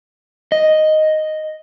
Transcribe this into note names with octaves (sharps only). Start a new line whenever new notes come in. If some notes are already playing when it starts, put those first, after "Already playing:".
D#5